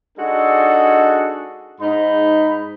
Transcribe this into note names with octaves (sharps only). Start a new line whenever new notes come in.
G#3 D4 D#4 F#4 G#4 A4
G#2 D#4 B5